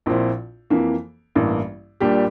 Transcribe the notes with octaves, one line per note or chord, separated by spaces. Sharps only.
A#1 A#2 F3 C4 E4
F2 E3 A#3
A1 G2 E3 A#3
A#1 A#2 G3 D4 G4